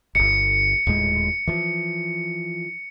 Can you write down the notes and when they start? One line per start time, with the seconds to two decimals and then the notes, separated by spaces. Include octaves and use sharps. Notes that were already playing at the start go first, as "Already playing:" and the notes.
0.15 D1 G1 C#7
0.87 D#1 A2 G#3
1.47 E3 F3